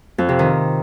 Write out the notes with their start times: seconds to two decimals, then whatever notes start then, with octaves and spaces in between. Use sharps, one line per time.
0.18 F2
0.29 C3
0.39 D#3